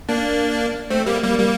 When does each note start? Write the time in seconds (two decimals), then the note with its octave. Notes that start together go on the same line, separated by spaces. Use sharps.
0.09 A#3 D4
0.90 A3 C4
1.06 G3 A#3
1.23 G3 A#3
1.39 G3 A#3